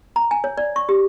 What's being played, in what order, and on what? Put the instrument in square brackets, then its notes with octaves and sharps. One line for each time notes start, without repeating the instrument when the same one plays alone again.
[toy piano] A#5
G#5
C#5
D5
C#6
G4